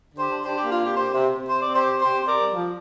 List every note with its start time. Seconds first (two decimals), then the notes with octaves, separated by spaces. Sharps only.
0.10 D3
0.19 G4 C5
0.27 D4
0.45 D4 G4 C5
0.58 G4
0.63 A#3
0.72 F4
0.81 C3 G4
0.97 C3 G4 C5
1.14 C3
1.32 C3
1.49 C4 C5
1.62 C4 D5
1.76 G4 C5
1.85 C3
2.01 C3 G4 C5
2.20 C3
2.27 A#4 D5
2.37 G3
2.54 F3